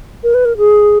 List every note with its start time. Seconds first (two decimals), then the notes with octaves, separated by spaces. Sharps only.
0.24 A#4
0.34 B4
0.45 A#4
0.57 G#4